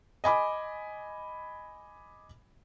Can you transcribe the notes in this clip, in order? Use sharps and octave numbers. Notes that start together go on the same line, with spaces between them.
D#5 G#5 B5 D6